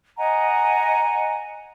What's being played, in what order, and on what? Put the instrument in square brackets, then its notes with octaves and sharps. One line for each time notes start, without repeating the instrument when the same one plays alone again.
[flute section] D#5 F#5 G#5 A#5